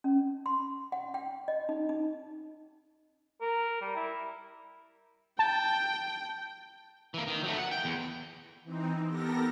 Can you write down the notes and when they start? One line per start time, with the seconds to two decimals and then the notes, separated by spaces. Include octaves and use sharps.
0.04 C#4
0.46 C6
0.92 F#5
1.14 G5
1.48 D#5
1.69 D#4
1.89 D#4
3.41 A#4
3.81 G3
3.96 E4
5.39 G5 A5
7.14 E3 A#3
7.27 D#3
7.44 F#3 A3
7.58 F#5
7.71 G5
7.85 E2
8.63 E3 C4 D#4
9.06 B3 G4 A4 A#4 A#6